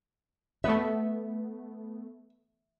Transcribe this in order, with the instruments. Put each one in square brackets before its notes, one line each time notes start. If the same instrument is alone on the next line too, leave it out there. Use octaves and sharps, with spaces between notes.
[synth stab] A3 B3 [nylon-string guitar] E5